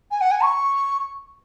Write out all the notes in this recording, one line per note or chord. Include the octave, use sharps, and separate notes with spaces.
G#5
F#5
G#5
C#6